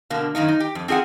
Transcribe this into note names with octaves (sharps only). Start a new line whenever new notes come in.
B2 D3 A#3
F#2 D#3 A#3 D#4
D#4
G4
F2
C4 F4 G#4 E5 F#5